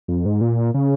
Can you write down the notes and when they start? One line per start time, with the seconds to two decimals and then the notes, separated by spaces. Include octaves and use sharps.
0.08 F2
0.26 G#2
0.41 A#2
0.74 C#3